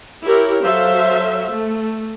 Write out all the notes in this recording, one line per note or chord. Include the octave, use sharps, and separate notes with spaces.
E4 G4 A#4 C#5
F#3 A4 C5 E5 F5
A3